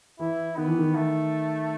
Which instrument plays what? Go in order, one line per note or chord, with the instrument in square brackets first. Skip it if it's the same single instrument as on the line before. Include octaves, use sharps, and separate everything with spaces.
[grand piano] E3 [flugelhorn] E4
[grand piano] D#3 [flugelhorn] B3
[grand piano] E3
D#3
[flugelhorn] A3